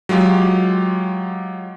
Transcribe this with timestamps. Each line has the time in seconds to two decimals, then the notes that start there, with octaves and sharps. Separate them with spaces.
0.09 F#3 G#3 F4 G4